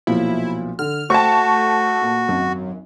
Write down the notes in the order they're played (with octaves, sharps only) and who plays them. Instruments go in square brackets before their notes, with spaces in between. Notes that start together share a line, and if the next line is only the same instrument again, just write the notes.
[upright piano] B1 A#2 F3 [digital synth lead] E4
[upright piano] D3 [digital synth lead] F6
[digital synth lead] A3 [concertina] F#4 [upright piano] C5 G5 [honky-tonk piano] A5 C#6
[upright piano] A#2
[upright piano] G#1 [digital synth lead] F#2